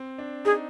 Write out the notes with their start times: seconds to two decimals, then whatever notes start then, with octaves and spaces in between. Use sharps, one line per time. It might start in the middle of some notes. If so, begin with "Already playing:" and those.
Already playing: C4
0.18 D4
0.45 D#4 G#4